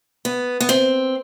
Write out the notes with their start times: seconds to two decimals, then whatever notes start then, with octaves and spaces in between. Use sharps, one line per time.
0.25 B3
0.60 B3
0.69 C4